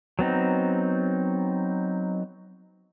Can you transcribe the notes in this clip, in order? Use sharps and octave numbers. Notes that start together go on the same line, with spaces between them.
F#3 B3 C4 D#4